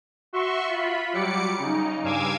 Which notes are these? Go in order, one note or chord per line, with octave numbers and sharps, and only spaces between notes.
F#4 E5 C6 C#6
F4 B5
F#3 G3 D6 C#7
C#3 D#4
G2 F5 G#5 D6 E6 G#6